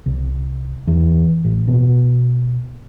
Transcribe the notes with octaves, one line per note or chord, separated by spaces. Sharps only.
C2
E2
A1
B2